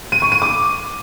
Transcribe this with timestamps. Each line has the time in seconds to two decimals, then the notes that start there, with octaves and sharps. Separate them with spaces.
0.12 D#7
0.22 C#6
0.32 D#7
0.42 D6